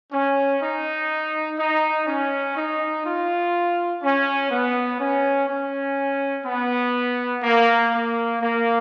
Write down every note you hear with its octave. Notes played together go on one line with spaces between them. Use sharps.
C#4
D#4
D#4
C#4
D#4
F4
C#4
B3
C#4
C#4
B3
A#3
A#3
A#3